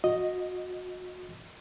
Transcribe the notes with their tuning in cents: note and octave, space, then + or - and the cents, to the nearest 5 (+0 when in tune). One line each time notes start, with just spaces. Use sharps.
F#4 -30 D#5 +0